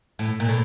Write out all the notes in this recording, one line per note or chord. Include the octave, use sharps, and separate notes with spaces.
A2
A#2
A2